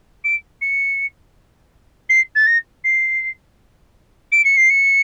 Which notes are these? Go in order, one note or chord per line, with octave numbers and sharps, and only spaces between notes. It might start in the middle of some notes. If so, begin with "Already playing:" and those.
D7
C#7
C7
A6
A#6
C7
D7
C#7
C7
C#7